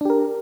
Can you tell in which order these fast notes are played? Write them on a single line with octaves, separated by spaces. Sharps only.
D4 G4 A#4